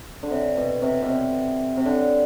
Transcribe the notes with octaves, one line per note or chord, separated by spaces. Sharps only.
D3
C3
B2
C3
B2
C3
C3
D3